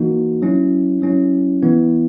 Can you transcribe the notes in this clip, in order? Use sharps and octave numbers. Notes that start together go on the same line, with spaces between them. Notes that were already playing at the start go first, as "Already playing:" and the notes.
Already playing: E3 A#3 D#4 F#4
F#3 C#4 E4
F#3 C#4 E4
E3 B3 E4